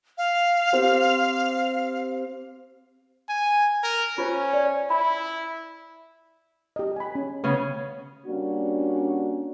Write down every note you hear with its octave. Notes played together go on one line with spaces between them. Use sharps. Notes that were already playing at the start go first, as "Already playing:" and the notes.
F5
C4 G4 E6
G#5
A#4
C#4 F4 C5
D5
E4 B5
G4 D#5
G#5 B5
C#4
C#3 B3 C#4 B4
G3 A#3 C#4 D4 F#4